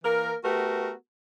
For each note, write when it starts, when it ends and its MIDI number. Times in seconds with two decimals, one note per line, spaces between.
0.04 0.34 52
0.04 0.34 58
0.04 0.34 70
0.44 0.92 57
0.44 0.92 59
0.44 0.92 66
0.44 0.92 67
0.44 0.92 70